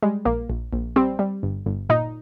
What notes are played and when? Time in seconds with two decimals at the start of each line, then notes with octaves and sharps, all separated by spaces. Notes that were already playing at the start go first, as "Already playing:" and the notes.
0.02 G3 G#3
0.25 A#1 A#3
0.50 A#1
0.73 A#1
0.96 G3 C4
1.19 G3
1.43 G1
1.66 G1
1.89 A#2 D#4